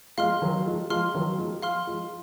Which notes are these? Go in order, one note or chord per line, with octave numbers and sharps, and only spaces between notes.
F3 G#3 F5 C6 F6
D#3 F#3
F3 G#3
F3 G#3 F5 C6 F6
D#3 F#3
F3 G#3
F5 C6 F6
F3 G#3